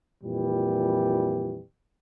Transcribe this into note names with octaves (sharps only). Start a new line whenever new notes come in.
F2 A#2 E3 G3